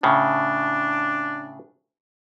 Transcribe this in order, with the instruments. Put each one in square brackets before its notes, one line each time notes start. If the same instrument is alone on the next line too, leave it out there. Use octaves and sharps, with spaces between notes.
[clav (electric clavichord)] A2 C#3 [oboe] D4